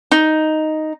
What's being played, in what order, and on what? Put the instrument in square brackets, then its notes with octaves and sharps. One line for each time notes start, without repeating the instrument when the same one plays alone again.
[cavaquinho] D#4